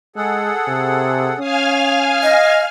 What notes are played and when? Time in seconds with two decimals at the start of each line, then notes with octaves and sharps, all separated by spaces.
0.16 G#3 G#4 A4 F#5
0.68 C3
1.39 C#4 F5 G#5 D#6 F6
2.23 D#5